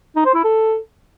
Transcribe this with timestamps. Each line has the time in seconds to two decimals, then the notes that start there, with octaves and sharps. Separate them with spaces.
0.16 D#4
0.25 C5
0.35 E4
0.44 A4